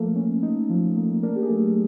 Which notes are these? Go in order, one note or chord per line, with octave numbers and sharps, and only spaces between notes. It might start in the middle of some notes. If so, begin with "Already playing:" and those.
Already playing: F3 A3 A#3 A4
C#4
D#4
F3
A#3
A#3 D4 A#4
G4
G#4
F#3 A3 A4